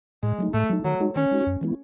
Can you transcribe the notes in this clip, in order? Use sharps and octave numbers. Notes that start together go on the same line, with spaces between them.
A2 G#3
F#3 A3 D#4
A2 A3
F#3 A3 D#4
D#3 F#3
G#3 D#4 F#4
D#3 C#4
G#3 D#4 F#4
F#2
E3 G#3 B3 E4